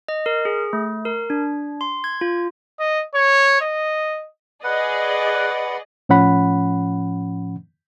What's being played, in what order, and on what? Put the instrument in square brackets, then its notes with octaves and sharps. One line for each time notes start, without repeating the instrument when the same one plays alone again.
[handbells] D#5
A#4
G#4
A3
A#4
D4
C6
G#6
F4
[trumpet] D#5
C#5
D#5
[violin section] G#4 D5 D#5 [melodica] B4 F#5
[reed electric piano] A2 F3 C#4 F#5 B5